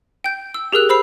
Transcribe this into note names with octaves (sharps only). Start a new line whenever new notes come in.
G5 G6
E6
G4 G#4 A#4 E6 F#6
C5 B5 E6 C7